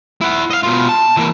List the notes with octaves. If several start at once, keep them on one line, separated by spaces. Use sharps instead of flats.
E4 F#5
D#5 F5
B2 F4
A5
E3 A#3